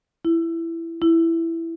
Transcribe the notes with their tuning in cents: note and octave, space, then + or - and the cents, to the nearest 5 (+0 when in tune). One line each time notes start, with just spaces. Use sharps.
E4 +10
E4 +5